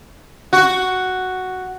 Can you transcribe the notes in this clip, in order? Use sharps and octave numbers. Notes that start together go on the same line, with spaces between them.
F#4